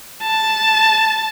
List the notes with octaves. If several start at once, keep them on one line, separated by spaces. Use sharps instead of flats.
A5